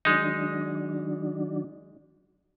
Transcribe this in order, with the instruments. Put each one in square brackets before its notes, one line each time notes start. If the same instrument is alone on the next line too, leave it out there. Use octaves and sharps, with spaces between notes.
[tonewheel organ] D#3 F#3 D4 [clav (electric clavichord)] G#3 D#4